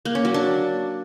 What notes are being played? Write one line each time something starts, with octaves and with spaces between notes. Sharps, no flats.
A#3
C#4
F#3
D4